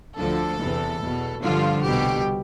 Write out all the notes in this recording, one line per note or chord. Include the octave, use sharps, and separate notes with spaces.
D2 D3 F3 A4
E2 C3 E3
E2 B2
G2 D3 F3 F4
C2 B2 G4